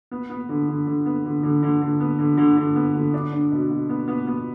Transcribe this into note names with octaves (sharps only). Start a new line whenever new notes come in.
B3
B3
D3
D3
D3
B3
D3
D3
D3
D3
B3
D3
D3
D3
B3
D3
D4
D4
B2
B2
B3
B3
B3